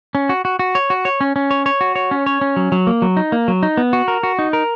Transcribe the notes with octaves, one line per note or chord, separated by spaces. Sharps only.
C#4
F#4
F#4
F#4
C#5
F#4
C#5
C#4
C#4
C#5
C#5
F#4
C#5
C#4
C#5
C#4
F#3
F#3
A#3
F#3
D#4
A#3
F#3
D#4
B3
F#4
A#4
F#4
D#4
A#4